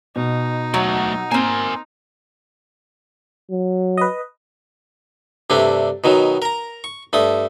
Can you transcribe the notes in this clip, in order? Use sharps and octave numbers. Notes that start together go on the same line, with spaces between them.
B2 D#4
F#3 A3 F#4
A#3 C4 A#4 G#5
F#3
B4 D#5
G2 C3 A3 D4
B2 D#3 F#3
A#4 A#5
C#6
G2 A3 D#6